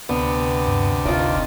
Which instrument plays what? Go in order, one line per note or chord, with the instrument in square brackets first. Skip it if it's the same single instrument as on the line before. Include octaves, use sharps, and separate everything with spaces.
[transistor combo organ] D2 C3 D4 [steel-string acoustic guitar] B3
[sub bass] G2
[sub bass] F#1 [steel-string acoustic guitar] D#3 F4